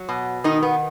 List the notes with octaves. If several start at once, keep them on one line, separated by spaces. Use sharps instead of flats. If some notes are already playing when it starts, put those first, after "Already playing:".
Already playing: F#3
B2
D#3 D#4
B3